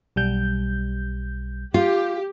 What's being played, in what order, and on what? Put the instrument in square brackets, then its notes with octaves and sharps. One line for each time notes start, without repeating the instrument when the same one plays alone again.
[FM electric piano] B1 G3 G6
[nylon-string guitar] F4 [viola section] G4